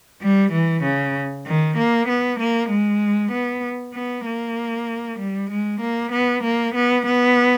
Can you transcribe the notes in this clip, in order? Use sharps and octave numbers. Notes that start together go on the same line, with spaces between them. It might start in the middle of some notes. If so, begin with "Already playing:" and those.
G3
E3
C#3
D#3
A#3
B3
A#3
G#3
B3
B3
A#3
G3
G#3
A#3
B3
A#3
B3
B3